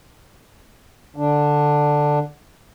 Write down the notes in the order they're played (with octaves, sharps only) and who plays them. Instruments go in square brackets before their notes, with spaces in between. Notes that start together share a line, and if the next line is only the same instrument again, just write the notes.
[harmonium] D3 D4